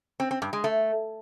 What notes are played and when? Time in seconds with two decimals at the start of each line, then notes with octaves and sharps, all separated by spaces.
0.20 C4
0.31 C4
0.42 G2
0.53 G#3
0.64 A3